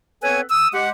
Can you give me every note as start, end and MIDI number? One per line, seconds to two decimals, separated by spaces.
0.23 0.41 59
0.23 0.41 60
0.23 0.41 69
0.23 0.41 71
0.23 0.41 73
0.23 0.41 80
0.50 0.69 87
0.50 0.69 88
0.74 0.90 56
0.74 0.90 67
0.74 0.90 78